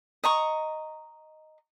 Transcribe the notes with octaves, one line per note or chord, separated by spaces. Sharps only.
D#5 A#5 C#6